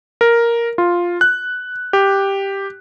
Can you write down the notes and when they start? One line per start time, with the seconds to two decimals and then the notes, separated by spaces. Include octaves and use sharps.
0.21 A#4
0.78 F4
1.21 F#6
1.93 G4